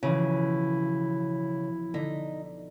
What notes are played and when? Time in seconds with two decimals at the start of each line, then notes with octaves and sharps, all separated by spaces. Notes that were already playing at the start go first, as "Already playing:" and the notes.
0.03 B1 C#3 E3 F3 E4
1.94 D3 D#4 B6